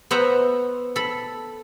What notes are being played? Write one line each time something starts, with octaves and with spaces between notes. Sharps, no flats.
B3 C5 E5 F#5 A#5
A4 B5